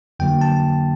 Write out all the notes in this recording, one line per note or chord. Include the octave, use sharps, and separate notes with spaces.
F2 D3 F#3 A#3 G5
A5